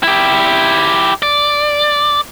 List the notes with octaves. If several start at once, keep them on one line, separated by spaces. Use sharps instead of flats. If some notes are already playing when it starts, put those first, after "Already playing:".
E4 G4
D5